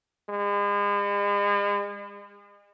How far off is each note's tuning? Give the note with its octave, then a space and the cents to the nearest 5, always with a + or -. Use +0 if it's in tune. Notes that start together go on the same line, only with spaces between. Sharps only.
G#3 -40